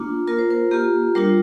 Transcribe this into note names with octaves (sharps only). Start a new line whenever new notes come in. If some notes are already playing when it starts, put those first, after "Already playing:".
Already playing: A#3 D4 F4
A#3 F4 A#4
C5
A#4
A#3 F4 G4
G3 D4 F4 A#4